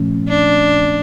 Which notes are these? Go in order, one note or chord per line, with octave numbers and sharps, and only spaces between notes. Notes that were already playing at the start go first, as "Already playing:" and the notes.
Already playing: A#2 F3 A3 C#4
D4